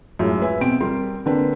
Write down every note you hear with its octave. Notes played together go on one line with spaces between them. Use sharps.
F#2 A2 G#3 F4
B4 E5 G#5
B2 C4 D7
G3 C4 A#4 C6
D3 A#3 C4 D4 B4